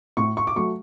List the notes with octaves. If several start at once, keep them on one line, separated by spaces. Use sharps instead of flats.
A2 C#6
C#6
D6
F#3 A3 C#6